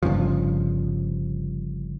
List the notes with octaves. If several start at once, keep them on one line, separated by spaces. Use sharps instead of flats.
G1 G2 C#3 F3